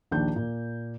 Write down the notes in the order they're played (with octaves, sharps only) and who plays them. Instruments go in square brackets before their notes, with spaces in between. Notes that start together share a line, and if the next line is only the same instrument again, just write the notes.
[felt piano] A#1 D#2 D4 G6
A#2